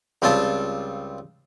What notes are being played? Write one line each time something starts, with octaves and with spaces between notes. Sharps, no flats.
C#2 G3 C4 F4 A5